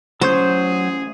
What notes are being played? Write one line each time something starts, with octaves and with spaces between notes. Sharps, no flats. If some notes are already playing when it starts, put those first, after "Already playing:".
F#3 A3 C#4 G#4 C5 C#6 G6